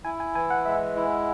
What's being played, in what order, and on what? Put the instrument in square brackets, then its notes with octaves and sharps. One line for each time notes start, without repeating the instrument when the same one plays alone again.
[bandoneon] E4 [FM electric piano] G#5
[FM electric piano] G#5
[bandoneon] E3 [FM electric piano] G#5
[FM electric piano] F#5
[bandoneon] G#3 [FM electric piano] E5
[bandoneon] E4